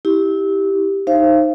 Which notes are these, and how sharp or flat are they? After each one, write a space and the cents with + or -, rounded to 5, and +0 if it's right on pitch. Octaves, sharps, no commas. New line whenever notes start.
E4 -25 G4 +0
D#4 +0 C5 +15 F5 -35